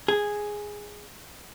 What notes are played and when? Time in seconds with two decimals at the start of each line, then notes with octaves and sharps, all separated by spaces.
0.08 G#4